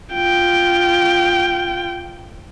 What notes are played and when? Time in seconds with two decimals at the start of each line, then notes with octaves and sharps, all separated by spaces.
0.14 F4 G5